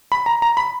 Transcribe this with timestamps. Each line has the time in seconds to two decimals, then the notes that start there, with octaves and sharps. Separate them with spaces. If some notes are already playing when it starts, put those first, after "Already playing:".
0.12 B5
0.26 A#5
0.42 A#5
0.57 B5